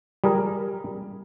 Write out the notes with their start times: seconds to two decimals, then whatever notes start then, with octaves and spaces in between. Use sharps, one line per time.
0.24 G3 G#4 A#4